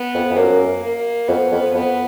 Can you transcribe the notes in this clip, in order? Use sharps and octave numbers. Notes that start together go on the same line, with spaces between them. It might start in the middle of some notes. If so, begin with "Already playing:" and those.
Already playing: B3
F2
F2
F#2 A#3
A#3
F2 B3
F2
F2 B3